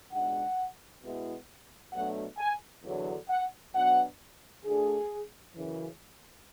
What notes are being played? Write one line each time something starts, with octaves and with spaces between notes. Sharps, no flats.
C#2 B2 G#3 D4 F#5
B2 G#3 B3 E4
B2 F#3 A3 D4 F#5
G#5
E2 D3 F#3
F#5
B2 F#3 B3 D4 F#5
D2 D3 A3 D4 G#4
F#2 C#3 E3